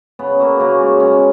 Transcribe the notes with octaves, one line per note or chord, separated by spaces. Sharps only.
C#3 B3
F#3 A#3
C#3 A#3
G#3
B2 C#4